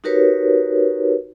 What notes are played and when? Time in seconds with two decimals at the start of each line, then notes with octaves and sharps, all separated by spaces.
0.04 D#4 F#4 G4 A#4 B4 C#5